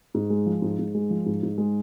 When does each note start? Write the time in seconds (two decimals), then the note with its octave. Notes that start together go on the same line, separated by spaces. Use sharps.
0.14 G#2
0.30 G#3
0.46 F3
0.62 G#2
0.79 G#2
0.94 G#3
1.10 F3
1.26 G#2
1.43 G#2
1.58 G#3